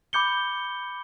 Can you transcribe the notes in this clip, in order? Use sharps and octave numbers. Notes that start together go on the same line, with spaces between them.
B5 D6 G6 C#7 G7